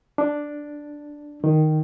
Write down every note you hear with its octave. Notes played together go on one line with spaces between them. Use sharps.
D4
D#3